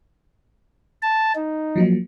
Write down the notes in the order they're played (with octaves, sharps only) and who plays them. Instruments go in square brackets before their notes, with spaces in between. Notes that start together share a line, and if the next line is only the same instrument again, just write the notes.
[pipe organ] A5
D#4
[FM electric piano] F3 F#3 A#3